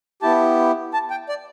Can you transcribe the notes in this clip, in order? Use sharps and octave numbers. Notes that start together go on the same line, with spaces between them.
B3 E4 G4 A5
A5
G5
D5